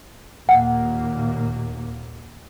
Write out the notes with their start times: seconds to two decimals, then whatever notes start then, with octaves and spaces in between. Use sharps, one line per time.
0.49 D#2 A#2 A#3 F#5